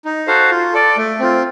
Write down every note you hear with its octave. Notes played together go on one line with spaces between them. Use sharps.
D#4
F#4 A4 C5 F5
F4
A4 D5
A3
C4 F4